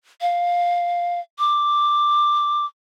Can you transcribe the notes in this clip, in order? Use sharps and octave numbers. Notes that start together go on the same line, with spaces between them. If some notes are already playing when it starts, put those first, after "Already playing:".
F5
D6